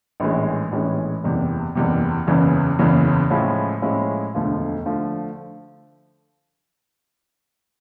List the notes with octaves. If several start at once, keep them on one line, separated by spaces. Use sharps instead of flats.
A#1 A2 E3 G#3 C#4
A#1 A2 E3 G#3 C#4
F#1 E2 C3
F#1 E2 C3
F#1 E2 C#3 E3
F#1 E2 C#3 E3
A2 F3 G#3 C#4 E4
A2 F3 G#3 C#4 E4
E1 D2 D3 F3 A3
D3 F3 A3